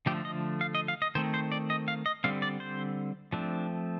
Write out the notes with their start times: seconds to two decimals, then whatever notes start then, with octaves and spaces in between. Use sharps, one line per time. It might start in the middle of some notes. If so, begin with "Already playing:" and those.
0.06 D3 F3 A3 G4
0.25 D#5
0.61 F5
0.75 D#5
0.88 F5
1.02 D#5
1.15 D#3 A3 C4 C5
1.34 C5
1.52 D5
1.70 D#5
1.88 F5
2.06 D#5
2.24 D3 G3 C4 F5
2.42 D5
2.60 C5
3.33 F3 A3 C4 D4